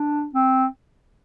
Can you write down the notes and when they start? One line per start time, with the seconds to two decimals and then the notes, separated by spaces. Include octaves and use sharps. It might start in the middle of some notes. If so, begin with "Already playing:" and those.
Already playing: D4
0.34 C4